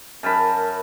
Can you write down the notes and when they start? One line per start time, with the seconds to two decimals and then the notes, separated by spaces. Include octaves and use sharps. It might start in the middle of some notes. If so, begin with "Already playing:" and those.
0.23 F#2 A#4 A5 B5